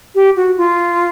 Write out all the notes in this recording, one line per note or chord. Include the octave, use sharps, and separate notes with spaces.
G4
F#4
F4